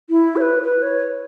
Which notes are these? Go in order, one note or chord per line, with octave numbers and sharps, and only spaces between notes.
E4
C#5
B4
B4
C#5